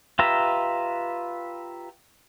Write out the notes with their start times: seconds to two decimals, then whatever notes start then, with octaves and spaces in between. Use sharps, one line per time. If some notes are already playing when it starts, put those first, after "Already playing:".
0.19 F4 G4 B4 E5 A#5